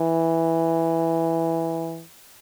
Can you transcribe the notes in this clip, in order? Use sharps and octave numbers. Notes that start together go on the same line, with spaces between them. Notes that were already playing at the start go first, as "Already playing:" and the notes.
Already playing: E3